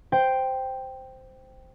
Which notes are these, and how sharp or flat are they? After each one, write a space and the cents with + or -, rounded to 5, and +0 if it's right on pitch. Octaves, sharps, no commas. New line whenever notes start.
C5 -5 G5 +0